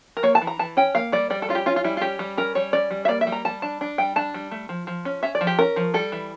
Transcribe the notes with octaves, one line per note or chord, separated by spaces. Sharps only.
A#4
A#3 C#5
A5
E3
A#5
E3 A5
C#4 G5
A#3 F5
G3 D5
G3 D5
A4
C#4 F4
G4
C#4 F4
F4
G3 E4
F4
C#4 G4
G3
C#4 A#4
G3 C#5
C#4 D5
G3
E5
A#3 D5
E5
G3
A#5
G3 A5
D4 A5
D4
G3 G5
D4 A5
G3
A3
F3
F3
C#4
C#4 E5
D5
F3
G4
C#4 A#4
F3
G3 A4
E3